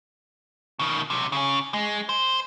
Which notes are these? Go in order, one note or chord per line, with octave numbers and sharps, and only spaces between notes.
B2 D#3
B1 C3
C#3 C#4
G#3
C5